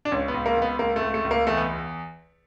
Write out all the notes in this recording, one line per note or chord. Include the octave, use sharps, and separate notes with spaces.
D4
C#2 C#4
B3
C#2
A#3
C#2
B3
C#2 A#3
A3
C#2
A3
C#2
A#3
E2 A3
B3